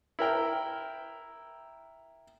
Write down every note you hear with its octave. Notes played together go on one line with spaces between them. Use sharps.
E4 A#4 G5